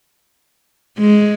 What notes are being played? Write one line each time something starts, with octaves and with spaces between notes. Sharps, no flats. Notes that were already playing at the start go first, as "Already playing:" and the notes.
G#3